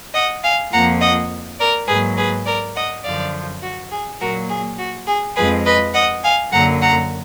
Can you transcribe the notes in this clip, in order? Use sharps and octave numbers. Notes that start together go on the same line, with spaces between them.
D#5 F#5
F5 G#5
F2 F3 A#3 F#5 A#5
D#5 F#5
A#4 D5
G#2 F#3 A#3 G#4 B4
G#4 B4
A#4 D5
D#5 F#5
F#2 D3 F3 D5 F5
F#4
G#4
A#2 F#3 A#3 F#4 A#4
G#4
F#4
G#4
F2 F3 G#3 G#4 B4
B4 D#5
D#5 F#5
F5 G#5
F#2 D3 F#3 A#3 F#5 A#5
F#5 A#5